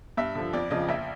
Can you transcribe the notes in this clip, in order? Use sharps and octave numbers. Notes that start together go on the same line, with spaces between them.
G2 E5
D3 F3
F2 D5
C#3 F3 D#5
A#1 E5